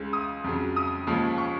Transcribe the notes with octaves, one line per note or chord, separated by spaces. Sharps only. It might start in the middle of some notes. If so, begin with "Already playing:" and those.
Already playing: C#2 C#3 G#3
D#6
F2 C#3 F#3
D#6
D#2 C#3 F3 G#3
C#6